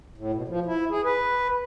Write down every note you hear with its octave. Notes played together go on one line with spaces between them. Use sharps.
A2
B2
F3
E4
G#4
B4